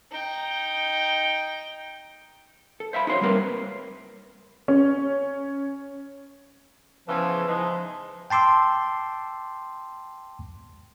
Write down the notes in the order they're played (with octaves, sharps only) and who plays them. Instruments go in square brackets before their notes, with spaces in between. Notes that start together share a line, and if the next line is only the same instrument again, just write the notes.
[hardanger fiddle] D#4 G5
[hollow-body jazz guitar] A4
C5 E5 F5 B5
D#4 F#4 C5 C#5
G3 A#3 C4 A#4 B4
[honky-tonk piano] C#4
[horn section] C#3 E3 B3 [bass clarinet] F3
[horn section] E3 G#3 D#4 [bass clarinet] F3
[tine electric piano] G5 A5 C6 D6 E6